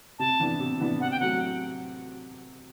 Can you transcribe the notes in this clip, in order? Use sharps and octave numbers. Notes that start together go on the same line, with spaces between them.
C3 A5
E3 B3 D4
C3
E3 B3 D4
C3 F#5
G5
F#3 A3 F#5